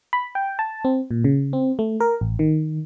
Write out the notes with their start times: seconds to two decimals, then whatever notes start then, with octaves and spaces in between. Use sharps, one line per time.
0.13 B5
0.35 G5
0.59 A5
0.85 C4
1.11 A#2
1.24 C#3
1.53 C4
1.79 A3
2.00 A#4
2.21 A1
2.39 D#3